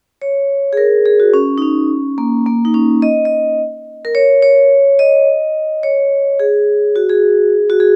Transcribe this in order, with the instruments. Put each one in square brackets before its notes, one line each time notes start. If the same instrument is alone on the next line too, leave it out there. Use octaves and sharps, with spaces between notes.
[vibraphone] C#5
G#4
A#4
G#4
F#4
C#4
D#4
C#4
A#3
A#3
D#4
C#4
D#5
D#5
A#4
C#5
C#5
D#5
C#5
G#4
F#4
G#4
F#4
G#4